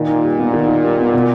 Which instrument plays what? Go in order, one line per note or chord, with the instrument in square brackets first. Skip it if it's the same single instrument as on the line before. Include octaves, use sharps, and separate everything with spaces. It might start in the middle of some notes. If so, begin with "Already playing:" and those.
Already playing: [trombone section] A#2 [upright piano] D#3
[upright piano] D#4
G3
B3
D#3
D#4
G3
B3
B2